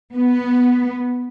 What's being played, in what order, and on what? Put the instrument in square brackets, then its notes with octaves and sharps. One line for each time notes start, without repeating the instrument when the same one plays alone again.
[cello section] B3